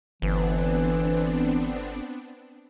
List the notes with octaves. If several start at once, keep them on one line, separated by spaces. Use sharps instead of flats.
G1 E3 B3 C4 D4